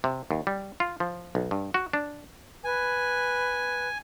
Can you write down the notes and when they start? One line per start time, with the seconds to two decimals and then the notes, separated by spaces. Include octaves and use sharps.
0.04 C3
0.31 D#2
0.47 G3
0.80 F4
1.00 F3
1.35 B1
1.51 G2
1.74 F#4
1.93 D4
2.64 B4 G#5